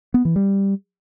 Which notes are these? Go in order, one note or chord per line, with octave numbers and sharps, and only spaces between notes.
B3
E3
G3